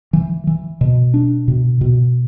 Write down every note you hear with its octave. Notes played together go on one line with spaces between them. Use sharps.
E3
E3
B2
D4
B2
B2